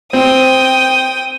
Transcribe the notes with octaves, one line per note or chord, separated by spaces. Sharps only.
C4 G5 D#6